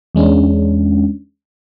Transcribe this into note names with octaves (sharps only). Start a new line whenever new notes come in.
E2 G#3 C#4 D4